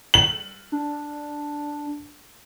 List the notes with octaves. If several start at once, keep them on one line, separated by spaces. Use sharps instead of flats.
F#7
D4